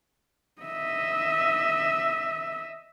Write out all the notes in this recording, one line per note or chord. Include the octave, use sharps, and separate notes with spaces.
D#5 E5